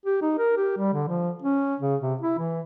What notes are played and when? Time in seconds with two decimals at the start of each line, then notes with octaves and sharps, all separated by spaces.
0.06 G4
0.21 D#4
0.39 A#4
0.57 G4
0.77 G3
0.93 D3
1.08 F3
1.42 C#4
1.80 C#3
2.01 C3
2.21 E4
2.38 E3